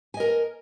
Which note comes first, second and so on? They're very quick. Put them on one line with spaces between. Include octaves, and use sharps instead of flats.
G#5 D#5 A#4